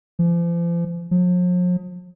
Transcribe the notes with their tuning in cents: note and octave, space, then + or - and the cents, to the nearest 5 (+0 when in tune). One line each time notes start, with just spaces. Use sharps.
F3 -40
F3 +45